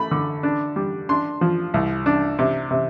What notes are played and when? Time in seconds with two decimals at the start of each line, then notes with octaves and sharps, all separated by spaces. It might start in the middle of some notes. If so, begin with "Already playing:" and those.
Already playing: A3 B5
0.11 D3
0.43 D4
0.76 G3
1.09 D4 C6
1.41 F3
1.74 C2
2.06 D4
2.39 C3
2.71 C3